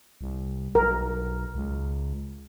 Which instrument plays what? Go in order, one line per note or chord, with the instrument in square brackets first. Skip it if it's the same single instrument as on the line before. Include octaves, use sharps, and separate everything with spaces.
[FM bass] C2
[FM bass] B1 [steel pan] A#4
[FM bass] C#2